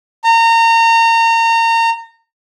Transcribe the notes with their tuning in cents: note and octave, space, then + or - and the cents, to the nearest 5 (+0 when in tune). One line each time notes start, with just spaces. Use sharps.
A#5 -30